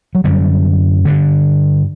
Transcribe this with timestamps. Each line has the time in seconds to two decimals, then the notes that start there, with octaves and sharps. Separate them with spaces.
0.15 F#3
0.24 F#2 D3 G3
1.05 G2 D3